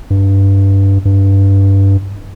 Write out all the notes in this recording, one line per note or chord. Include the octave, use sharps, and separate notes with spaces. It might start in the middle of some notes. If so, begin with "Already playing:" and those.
G2
G2